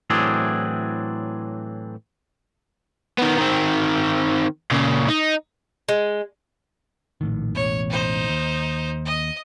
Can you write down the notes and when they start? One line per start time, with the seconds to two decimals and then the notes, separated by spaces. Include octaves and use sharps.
0.10 A2 E3 F#3 C4 D4 G#4
3.18 D#3 B3
3.38 D#3 C4
4.71 A#2 C#3
5.08 D#4
5.88 G#3
7.21 A#1 A2 D#3
7.55 E1 A1 E2 C#5
7.90 D#4 C5
8.29 D#2
9.05 D#5 D#6